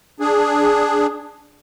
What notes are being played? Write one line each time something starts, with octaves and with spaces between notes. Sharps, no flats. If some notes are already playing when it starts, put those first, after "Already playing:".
D4 G#4